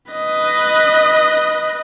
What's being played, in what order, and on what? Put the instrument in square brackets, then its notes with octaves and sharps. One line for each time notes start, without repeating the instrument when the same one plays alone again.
[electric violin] B4 D#5